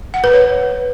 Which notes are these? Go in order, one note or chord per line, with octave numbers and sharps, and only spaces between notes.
F#5
B4
C#5